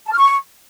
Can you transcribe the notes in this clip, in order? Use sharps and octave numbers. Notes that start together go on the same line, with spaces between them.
A5
F6
C#6